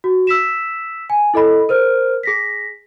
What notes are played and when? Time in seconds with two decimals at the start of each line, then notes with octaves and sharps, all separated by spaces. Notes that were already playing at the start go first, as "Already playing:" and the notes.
0.04 F#4
0.27 E6 B6 E7
1.10 G#5
1.34 E4 A4 D#5 B5
1.69 A#4 C5 F6
2.23 G#4 A#6 B6